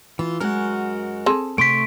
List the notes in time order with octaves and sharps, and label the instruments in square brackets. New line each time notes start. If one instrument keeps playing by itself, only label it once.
[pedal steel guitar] E3 [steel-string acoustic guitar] F4
[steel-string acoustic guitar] F#2 G#3 F#4 [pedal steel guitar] A#4 F#5
[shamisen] C4 G#4 A4
[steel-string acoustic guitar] C3 [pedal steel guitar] A3 C6 C#6 [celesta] B6 D7